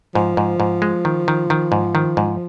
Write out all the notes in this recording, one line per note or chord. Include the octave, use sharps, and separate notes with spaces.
G#2 F3
G#2
G#2
G#3
D#3
D#3
D#3
G#2
D#3
G#2